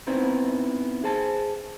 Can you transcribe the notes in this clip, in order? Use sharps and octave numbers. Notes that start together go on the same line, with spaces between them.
B3 C4 D#4 E4 C5
G#4 C5 G#5 A5